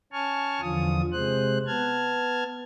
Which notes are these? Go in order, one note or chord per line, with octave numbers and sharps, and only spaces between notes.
C#4 G#5 A5 C#6 F6
E2 D3 F3 F4 D#6
C3 G#3 C5 F#6
B3 A5 F6 G#6